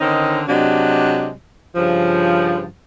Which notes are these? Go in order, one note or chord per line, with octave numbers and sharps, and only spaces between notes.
D3 D#3 C4 C#4 D#4
C3 F#3 G#3 D4
G2 C#3 F3